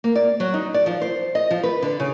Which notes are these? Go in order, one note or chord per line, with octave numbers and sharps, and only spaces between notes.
A#3
D5
F#3
D#4
D5
F3
C5
D#5
F3
B4
D3
C#3